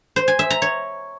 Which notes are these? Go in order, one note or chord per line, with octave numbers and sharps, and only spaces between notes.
C5
G#5
E5
A#5
C#5